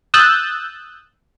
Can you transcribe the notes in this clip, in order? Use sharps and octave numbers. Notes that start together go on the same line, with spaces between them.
D#6 E6 F#6 G6 A6